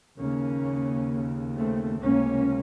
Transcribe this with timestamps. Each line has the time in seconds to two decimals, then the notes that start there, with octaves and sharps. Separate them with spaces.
0.18 D#2 C#3 A#3 C#4
1.56 A3 C4
2.00 C#2 C3 A#3 C#4